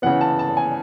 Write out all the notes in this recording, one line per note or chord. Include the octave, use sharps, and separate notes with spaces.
C#3 E3 B3 F#5
A5
A5
G#5